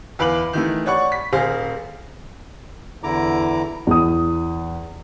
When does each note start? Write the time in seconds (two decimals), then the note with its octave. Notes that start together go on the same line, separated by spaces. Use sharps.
0.19 E2 B4 F5 D6 F#7
0.53 D#3 E3 A3
0.86 C#5 D5 F#5 B5 C#6
1.12 B6
1.33 D#1 G#4 C5 F5 A#6
3.03 E2 D3 E4 A#5 D6
3.87 E2 D#6